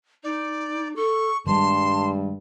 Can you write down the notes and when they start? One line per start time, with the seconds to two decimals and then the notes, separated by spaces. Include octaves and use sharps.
0.24 D#4 D5
0.96 A4 C#6
1.47 G2 D#3 G3 G#3 A5 C6